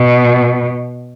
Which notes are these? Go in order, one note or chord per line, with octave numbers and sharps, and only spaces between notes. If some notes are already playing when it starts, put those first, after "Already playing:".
Already playing: B2